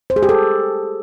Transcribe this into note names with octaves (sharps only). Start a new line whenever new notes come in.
C5
G#4
G4
A4